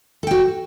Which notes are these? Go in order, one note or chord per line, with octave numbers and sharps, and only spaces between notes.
F#4 A4 G5